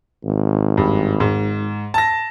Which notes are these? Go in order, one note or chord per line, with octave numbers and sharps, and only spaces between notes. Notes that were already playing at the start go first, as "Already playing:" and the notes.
G#1
G2
G#2
A5 A#6